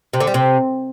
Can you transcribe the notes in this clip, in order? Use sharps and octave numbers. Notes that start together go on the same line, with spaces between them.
C3
D3
G3
C3